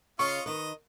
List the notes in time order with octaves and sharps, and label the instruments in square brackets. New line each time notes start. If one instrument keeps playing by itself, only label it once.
[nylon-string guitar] C#3 [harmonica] F4 D#5 F5 [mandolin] C#6
[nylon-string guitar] D#3 B4 [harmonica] D#5